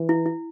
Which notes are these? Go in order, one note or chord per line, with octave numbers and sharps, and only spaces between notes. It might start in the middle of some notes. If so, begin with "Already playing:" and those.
Already playing: E3
E4
E4